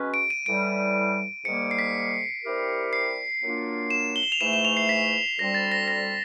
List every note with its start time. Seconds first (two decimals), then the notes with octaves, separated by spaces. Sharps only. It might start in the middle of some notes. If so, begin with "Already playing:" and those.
Already playing: B2 G#3 C#4 F#4 B4
0.14 D7
0.30 D#7
0.46 A2 E3 G3 D7
1.45 G#2 D#3 G3 A#3 C#7
1.71 C7
1.79 B6
2.44 G3 C4 E4 G4 A#4
2.93 C7
3.42 A#2 F#3 A#3 D4 F4
3.90 E7
4.16 G7
4.23 F#7
4.32 F7
4.41 G#2 E3 A3 E7
4.53 E7
4.65 F7
4.77 C7
4.89 B6
5.38 D2 D3 G3 C4 A#6
5.54 A6
5.72 A#6
5.88 A#6